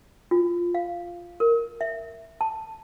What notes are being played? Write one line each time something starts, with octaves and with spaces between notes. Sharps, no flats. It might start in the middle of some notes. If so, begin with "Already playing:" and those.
F4
F5
A#4
E5
A5